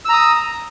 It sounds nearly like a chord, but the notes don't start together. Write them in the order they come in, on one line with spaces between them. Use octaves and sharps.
E6 A#5 D#6